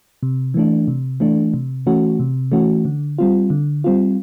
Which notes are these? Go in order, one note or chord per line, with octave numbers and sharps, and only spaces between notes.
C3
E3 A3 D4
C3
E3 A3 D4
C3
E3 A3 C#4 F#4
C3
E3 A3 C#4 F#4
D3
G3 C4 F4
D3
G3 C4 F4